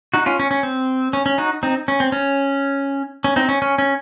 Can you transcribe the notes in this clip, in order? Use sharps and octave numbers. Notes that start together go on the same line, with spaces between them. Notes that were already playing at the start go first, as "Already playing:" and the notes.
D#4 F#4
C#4 F4
C#4
C#4
C4
C#4
C#4
D#4 F#4
C4 D#4
C#4
C4
C#4
C#4
C4 D#4
C#4
C#4
C#4